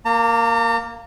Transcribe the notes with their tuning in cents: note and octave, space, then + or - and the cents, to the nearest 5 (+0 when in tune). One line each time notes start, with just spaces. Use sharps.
A#3 +0 A#5 -45